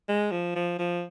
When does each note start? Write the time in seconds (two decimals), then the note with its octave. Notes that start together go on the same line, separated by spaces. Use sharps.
0.09 G#3
0.31 F3
0.56 F3
0.79 F3